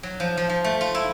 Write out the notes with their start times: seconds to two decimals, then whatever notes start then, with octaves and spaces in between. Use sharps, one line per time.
0.03 F#3
0.20 F3
0.37 F3
0.49 F3
0.64 A3
0.81 F4
0.95 E4